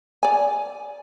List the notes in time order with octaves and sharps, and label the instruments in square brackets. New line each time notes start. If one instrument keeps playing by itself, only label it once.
[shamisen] D5 G#5